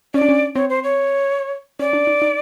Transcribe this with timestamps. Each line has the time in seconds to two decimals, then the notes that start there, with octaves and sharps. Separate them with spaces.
0.14 C#4 D5
0.21 D4
0.29 C#4
0.56 C4 C#5
0.70 C5
0.84 C#5
1.79 C#4 D5
1.93 D4
2.07 D#4
2.22 D#4